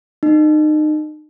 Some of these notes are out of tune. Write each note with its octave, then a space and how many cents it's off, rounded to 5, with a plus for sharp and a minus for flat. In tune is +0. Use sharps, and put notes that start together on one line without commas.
D#4 -30